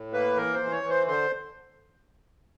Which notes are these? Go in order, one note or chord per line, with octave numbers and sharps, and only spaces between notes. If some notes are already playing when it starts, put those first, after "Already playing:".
Already playing: A2
A#3 B4
E3 A#4
C5
E3
C#5
E3
C5
D3 C5